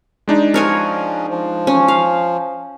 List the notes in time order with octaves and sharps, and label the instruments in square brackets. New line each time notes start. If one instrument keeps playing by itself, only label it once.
[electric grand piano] G#3 D4 D#4
[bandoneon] F3 C#4 [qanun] A#4 C#5 G#5
[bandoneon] F3
[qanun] C#4
F5